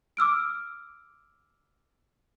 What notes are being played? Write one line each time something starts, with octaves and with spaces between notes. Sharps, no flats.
D6 E6 F6 D7